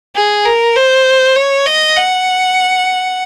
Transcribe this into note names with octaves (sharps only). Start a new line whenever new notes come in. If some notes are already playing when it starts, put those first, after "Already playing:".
G#4
A#4
C5
C#5
D#5
F#5